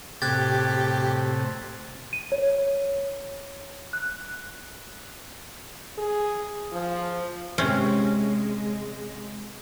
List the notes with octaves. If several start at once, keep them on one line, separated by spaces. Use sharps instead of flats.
A2 C3 G4 F#6 G#6 A6
D#7
C#5
F#6
G#4
F3
C3 G#3 C4 C#4